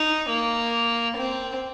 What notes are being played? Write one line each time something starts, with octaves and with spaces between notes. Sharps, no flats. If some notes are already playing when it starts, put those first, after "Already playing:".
Already playing: D#4
A#3
C4